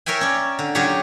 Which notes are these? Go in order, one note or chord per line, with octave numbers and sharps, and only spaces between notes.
A#4 C#5 E5 G5 G#5
C#4 D5
D3
C#3 F#3 F4 G4 C#5